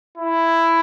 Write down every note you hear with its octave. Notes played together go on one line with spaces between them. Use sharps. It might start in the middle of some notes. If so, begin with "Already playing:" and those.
E4